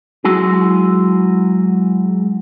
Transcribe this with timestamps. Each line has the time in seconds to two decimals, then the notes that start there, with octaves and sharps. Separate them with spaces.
0.24 F#3 G#3 E4 F#4 G#4